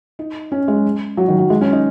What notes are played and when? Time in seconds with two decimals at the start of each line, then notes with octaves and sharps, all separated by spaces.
0.19 D#4
0.52 C#4
0.68 G#3
1.17 F#3
1.28 D#3
1.39 F#3
1.50 G#3
1.61 C#4
1.72 D#4